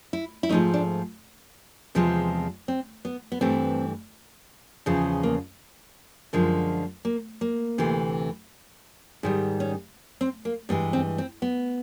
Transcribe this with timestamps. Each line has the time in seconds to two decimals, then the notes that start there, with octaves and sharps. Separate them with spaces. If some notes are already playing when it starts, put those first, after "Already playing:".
0.13 E4
0.43 E4
0.49 G#2 F3 A3 D#4
0.74 D4
1.95 E2 C3 F3 G#3
2.68 C4
3.05 B3
3.32 B3
3.41 G2 E3 A3 C4
4.86 E2 C#3 F3
5.23 A#3
6.33 F#2 D3 F3 G#3
7.05 A#3
7.41 A#3
7.78 D2 C3 E3
9.23 G#2 D#3 G3
9.60 C#4
10.21 C4
10.45 A#3
10.69 G2 E3 G#3 B3
10.93 C4
11.18 C4
11.42 B3